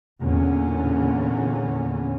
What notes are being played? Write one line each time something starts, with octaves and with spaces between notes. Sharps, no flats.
E2 A#2 D3 C#4